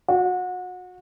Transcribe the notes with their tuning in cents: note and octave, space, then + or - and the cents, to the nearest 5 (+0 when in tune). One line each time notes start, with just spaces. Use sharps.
F#4 -30